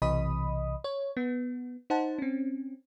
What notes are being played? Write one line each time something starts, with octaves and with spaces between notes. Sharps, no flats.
B1 C3 E3 D#5 B5 D#6
C#5
B3
D#4 C5 F#5 A5
C4 C#4